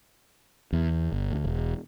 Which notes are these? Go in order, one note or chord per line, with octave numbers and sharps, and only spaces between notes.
E2
G1
D2
E1